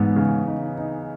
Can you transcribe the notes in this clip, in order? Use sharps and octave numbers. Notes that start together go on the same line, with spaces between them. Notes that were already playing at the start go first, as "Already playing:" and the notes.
Already playing: G#2 E3 B3
C#3
D#4
D#4